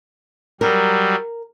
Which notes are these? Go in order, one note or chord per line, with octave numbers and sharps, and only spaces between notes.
F#3 G3 A#4